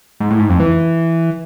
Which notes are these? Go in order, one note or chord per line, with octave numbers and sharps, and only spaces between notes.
G#2
A2
G#2
F2
E3